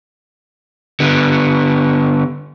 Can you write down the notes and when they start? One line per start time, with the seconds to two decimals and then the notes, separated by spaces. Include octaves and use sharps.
1.00 D3 B3